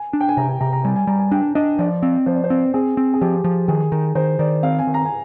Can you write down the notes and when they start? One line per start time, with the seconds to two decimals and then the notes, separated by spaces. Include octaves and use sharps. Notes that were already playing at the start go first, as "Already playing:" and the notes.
Already playing: G#5
0.13 D4
0.21 G5
0.29 G#5
0.37 C3 A#5
0.49 G#5
0.61 C3 A#5
0.73 A#5
0.85 G3 G#5
0.96 G#5
1.07 G3 A#5
1.20 G#5
1.31 D4 G5
1.55 D4 D#5
1.79 F3 D5
2.02 C4
2.26 F3 C5
2.35 D5
2.44 C5
2.50 C4
2.74 C4 G#4
2.97 C4
3.14 G#4
3.21 F3 G4
3.44 F3
3.68 D#3 G#4
3.92 D#3
4.15 D#3 C5
4.39 D#3 D5
4.63 C4 F5
4.79 G#5
4.87 D#3
4.94 A#5
5.05 G#5